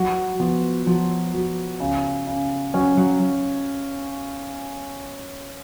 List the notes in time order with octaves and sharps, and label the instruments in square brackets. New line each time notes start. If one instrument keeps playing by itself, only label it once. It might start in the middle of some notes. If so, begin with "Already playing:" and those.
Already playing: [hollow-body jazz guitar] F#3 [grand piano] F#4
[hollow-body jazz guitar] F3 [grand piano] B3
[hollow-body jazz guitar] F3 [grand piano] F#3
[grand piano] F#3
C#3
C#3
[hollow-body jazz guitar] F#3 [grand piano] C#4
[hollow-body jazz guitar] F#3